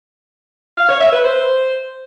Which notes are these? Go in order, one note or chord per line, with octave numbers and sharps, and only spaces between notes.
F5
C#5
E5
B4
C5